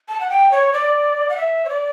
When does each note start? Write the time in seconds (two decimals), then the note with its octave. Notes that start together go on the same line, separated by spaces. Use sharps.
0.08 A5
0.20 F#5
0.30 G5
0.51 C#5
0.73 D5
1.29 F#5
1.37 E5
1.65 C#5
1.69 D5